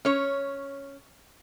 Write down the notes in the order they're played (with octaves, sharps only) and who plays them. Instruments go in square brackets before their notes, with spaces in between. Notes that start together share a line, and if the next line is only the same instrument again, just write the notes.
[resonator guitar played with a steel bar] C#4 C#5